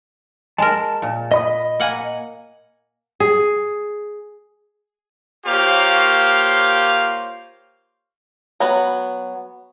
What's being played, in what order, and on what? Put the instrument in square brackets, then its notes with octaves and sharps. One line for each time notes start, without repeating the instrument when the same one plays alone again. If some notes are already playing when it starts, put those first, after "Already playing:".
[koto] G#3 A#4 [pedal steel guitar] A5
[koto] A#2
[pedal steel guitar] D#5 B5 D#6
[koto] A#3 F#5 G#5
[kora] G#4
[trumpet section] A#3 F4 G4 C5 C#5 F5
[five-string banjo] F#3 B3